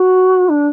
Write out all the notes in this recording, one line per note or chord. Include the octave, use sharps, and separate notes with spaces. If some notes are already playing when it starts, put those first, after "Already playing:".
Already playing: F#4
D4